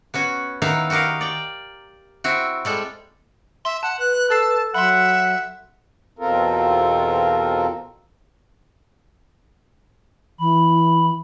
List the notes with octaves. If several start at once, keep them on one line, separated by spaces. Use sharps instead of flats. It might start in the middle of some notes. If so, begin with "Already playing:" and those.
B3 C#4 F#4 G#5
D#3 B3 D#4 E4 F5 A#5
F#4 G4 A#4 D#5 F5
D5 G5
C4 E4 F#4
G3 G#3 A4
E5 C6
F#5 A5
B4 F#6
A4 A5 E6 C7
F#3 E5 F#5 B5 C6
E2 B2 C4 F4 A4 A#4
E3 B5